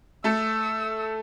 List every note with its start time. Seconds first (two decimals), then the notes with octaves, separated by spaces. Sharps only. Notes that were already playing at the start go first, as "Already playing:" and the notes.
0.24 A3 A4 E6